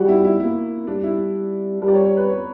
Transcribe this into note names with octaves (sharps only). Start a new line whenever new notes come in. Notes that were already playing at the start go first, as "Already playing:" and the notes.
Already playing: G3 F#4
E4
E4
A#3 E4
G3 D4
E4
G3 A#4
D5
C#5
C#5
B4
C#5